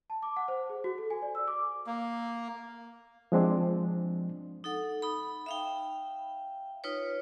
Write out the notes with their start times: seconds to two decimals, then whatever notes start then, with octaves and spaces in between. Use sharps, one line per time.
0.10 A5
0.23 D6
0.37 F#5
0.48 C5
0.70 G#4
0.84 F#4
0.98 A4
1.10 G#5
1.22 D5
1.35 E6
1.48 D6
1.87 A#3
3.32 F3 G#3 C4 D4
4.64 D#4 A4 F#5
5.02 D#4 B5
5.46 E5 F5 G5
6.84 D#4 F4 B4 C#5